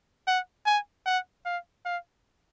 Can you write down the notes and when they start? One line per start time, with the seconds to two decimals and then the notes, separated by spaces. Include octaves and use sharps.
0.27 F#5
0.66 G#5
1.06 F#5
1.45 F5
1.85 F5